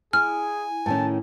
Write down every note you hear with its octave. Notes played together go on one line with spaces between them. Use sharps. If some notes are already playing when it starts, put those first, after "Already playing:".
E4 G#4 G#5 F6
A2 D#3 C#4 A5